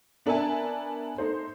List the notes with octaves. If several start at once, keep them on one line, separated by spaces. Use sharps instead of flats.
B3 D4 A#4 E5 G#5 A5
A3 D#4 C5